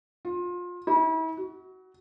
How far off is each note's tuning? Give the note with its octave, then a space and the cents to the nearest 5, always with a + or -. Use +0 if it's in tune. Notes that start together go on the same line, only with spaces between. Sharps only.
F4 +25
E4 -40
F#4 +15